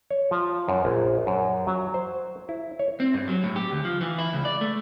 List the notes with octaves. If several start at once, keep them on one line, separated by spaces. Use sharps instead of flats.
C#5
F3
F#2
A#1
F#2
F#3
C5
E4
C#5
C4
G2
F#3
A2
G4
D2
F3
E3
E4
C#2
D5
A3